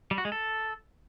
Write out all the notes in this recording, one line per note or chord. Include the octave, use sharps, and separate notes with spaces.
G3
F#4
G#3
A4